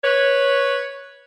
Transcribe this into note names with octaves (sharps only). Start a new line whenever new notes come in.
B4 C#5